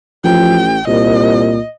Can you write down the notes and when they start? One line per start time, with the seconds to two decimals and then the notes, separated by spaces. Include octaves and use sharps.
0.24 A1 F3 G5
0.88 C2 A#2 D#5